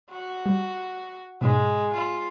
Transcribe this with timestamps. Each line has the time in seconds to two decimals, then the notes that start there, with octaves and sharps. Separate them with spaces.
0.10 F#4
0.46 G3
1.41 G#2 B2 G#3
1.94 F4